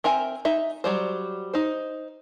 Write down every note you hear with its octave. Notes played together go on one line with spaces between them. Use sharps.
C4 A#4 E5 G#5
D#4 E5
F#3 G3 C5
D#4 C5